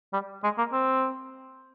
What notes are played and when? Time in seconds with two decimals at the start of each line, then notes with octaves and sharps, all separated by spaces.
0.13 G3
0.44 G#3
0.58 A#3
0.72 C4